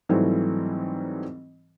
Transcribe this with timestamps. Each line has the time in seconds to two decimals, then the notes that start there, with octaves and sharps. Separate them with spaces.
0.09 G#2 E3 F#3 G3 A3 C4